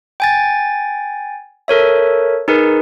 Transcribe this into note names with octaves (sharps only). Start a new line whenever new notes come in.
G5 G#5 A6
A4 A#4 C#5 E5
D#4 G#4 A#4 B4